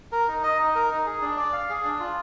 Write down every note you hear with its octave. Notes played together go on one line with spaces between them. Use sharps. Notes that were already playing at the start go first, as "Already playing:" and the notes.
A#4
D#4
D#5
D#4
A#4
D#4
G#4
D4
D5
F5
G#4
D4
F4